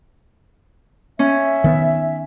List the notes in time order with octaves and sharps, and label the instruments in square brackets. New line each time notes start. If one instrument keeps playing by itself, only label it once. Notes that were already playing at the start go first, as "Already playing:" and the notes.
[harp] C#4 [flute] E5
[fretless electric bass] D#3 B3